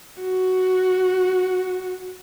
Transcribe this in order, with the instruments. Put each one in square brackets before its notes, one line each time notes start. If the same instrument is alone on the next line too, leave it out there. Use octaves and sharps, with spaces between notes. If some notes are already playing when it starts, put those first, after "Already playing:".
[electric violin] F#4